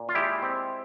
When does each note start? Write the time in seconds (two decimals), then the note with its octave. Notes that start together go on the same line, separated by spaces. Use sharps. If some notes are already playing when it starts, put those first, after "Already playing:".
Already playing: A#2
0.09 F4
0.15 G#3 E4 G4
0.43 C4